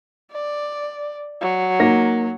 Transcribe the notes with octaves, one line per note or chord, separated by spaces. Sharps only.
D5
F#3
A#3 D#4 A#6